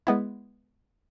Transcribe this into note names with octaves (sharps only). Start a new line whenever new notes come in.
G#3 B3 E4